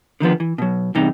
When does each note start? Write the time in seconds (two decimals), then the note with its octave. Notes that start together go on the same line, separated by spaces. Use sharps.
0.20 D3 D#3 F3 B3
0.40 E3
0.58 B2 F#3
0.95 E2 G2 C3 D#4